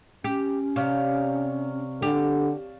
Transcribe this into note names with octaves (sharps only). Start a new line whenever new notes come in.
C#4 G4
C3 C#5 D5 F5
D3 G4 A5